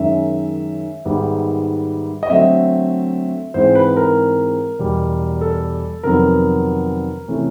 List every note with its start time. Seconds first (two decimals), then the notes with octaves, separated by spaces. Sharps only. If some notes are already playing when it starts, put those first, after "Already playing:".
Already playing: F#2 D#3 G#3 C#4 E5
1.05 G#2 D#3 G3 B3
2.23 D#5
2.30 D3 F#3 A3 C4 E5
3.54 G#2 E3 G#3 C4 C5
3.75 B4
3.96 A#4
4.79 E2 B2 G3
5.41 A4
6.03 F2 C3 D#3 F#3 B3 A#4
7.28 C3 E3 A3 C#4